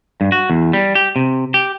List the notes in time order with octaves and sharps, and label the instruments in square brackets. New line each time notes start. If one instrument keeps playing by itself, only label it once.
[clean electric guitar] G2
F#4
E2
G3
G4
C3
G4